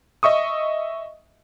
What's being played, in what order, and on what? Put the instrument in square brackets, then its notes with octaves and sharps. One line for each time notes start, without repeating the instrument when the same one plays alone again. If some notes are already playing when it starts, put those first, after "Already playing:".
[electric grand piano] D#5 E5 C#6 D#6